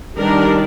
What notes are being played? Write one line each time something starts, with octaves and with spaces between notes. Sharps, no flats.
D#3 G3 D4 A#4